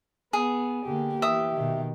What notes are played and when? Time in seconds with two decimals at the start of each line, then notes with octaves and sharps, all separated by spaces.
0.33 B3 G#4
0.86 D3 A#3 G4
1.22 E3 E5 D#6
1.54 B2 D#3